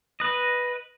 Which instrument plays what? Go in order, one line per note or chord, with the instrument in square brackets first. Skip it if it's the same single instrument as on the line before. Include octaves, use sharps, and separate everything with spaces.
[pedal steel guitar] B4 D#5